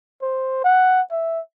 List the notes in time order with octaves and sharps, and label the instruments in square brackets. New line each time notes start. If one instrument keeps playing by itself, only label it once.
[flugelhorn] C5
F#5
E5